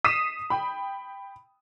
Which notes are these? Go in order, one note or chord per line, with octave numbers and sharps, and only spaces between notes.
D#6 B6 C7 D#7 E7
G5 B5